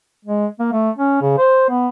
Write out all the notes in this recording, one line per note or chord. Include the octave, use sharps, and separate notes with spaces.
G#3
A#3
A3
C#4
C#3
C5
B3